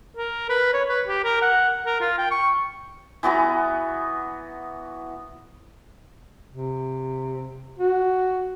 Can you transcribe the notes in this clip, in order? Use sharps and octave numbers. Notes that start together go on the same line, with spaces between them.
A#4
B4
C#5
B4
G4
A#4
F#5
A#4
F4
G5
C#6
E3 B3 F#4 A#5
C3
F#4